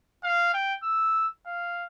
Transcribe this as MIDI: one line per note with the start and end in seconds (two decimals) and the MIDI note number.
0.24 0.52 77
0.54 0.74 79
0.83 1.27 88
1.46 1.85 77